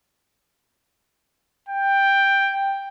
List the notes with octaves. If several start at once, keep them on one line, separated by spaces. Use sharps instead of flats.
G5